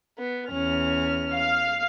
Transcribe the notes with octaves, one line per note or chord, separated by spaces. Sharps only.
B3
E2 C#4 F6
F5